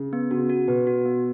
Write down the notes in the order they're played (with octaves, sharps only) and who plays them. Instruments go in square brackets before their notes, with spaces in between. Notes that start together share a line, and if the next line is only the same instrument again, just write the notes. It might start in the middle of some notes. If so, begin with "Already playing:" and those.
Already playing: [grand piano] C#3
[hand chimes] B3
[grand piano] C#3 [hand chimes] F#4
[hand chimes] F#4
[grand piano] B2 [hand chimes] B4
[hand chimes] F#4
B3